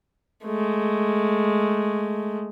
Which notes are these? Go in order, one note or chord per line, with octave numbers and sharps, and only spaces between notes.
G#3 A3